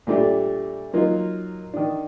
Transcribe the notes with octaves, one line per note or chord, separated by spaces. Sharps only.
A#2 G3 A3 D4 G4
F#3 A#3 D#4 F4
D#3 D4